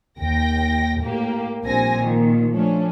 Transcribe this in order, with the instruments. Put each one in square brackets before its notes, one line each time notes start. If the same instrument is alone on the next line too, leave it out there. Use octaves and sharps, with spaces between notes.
[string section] D#2 G5 A#6
A2 A#3 G4
A#1 G2 G3 C4 G#5 A#6
A#2 D#3
F3 A3 C#4 D4